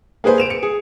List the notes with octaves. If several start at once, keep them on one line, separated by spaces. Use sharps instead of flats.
A#3 G#4 B4 C5 G#5
D7 E7 F7
C#7
G#4